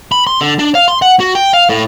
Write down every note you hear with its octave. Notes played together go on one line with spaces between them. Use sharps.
B5
C6
D3
D4
F5
C6
F#5
F#4
G5
F5
A2